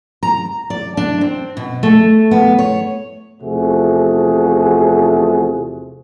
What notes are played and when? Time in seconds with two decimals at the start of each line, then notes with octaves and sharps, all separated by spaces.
0.23 A#5
0.70 D5
0.97 D4
1.21 C4
1.57 B2
1.83 A3
2.31 B3
2.59 C#5
3.43 E2 C3 F3 A3 F#4 G#4